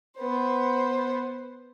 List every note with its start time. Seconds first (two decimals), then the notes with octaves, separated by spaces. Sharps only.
0.18 B3 C5